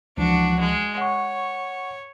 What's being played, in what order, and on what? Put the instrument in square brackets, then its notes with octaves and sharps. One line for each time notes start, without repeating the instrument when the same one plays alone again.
[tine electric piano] C#2 E3 F3 [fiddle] D4 F#4
[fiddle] G#3
[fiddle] C#5 [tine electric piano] F#5 C#6